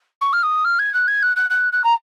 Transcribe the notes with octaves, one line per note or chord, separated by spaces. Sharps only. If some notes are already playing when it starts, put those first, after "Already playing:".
C#6
F6
D#6
F6
G#6
F#6
G#6
F#6
F#6
F#6
F#6
A#5